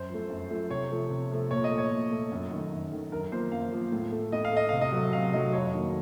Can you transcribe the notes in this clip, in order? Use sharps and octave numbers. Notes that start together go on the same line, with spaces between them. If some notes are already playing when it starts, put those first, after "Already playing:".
Already playing: F#2 C5
F3 A3
F#2
F3 A3
C3 C#5
F3 A3
C3
F3 A3
A#2 C#5
D#5
A3
C#5
A#2
A3
F#2
D#3 A3
F#2
D#3 A3
F#2 A#4
F3 A#3 C5
F#2 F5
F3 A#3
A2
A3
A2 D#5
F5
A3 D#5
C3 F5
D#5
F#3 A3
C3 F5
F#3 A3 D#5
F2 C#5
D#3 F#3 A#3